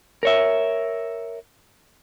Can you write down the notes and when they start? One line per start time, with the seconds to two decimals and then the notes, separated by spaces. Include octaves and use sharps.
0.23 A#4 C#5 E5